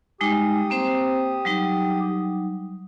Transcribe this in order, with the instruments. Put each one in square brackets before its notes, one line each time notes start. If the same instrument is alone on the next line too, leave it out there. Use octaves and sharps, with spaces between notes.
[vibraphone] G3 G#3 D#4 [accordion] G4 D#6
[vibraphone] A#3 C4 C5
F#3 G3 D#4